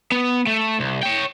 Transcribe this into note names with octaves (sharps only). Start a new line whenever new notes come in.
B3
A3
C2
C#5 G5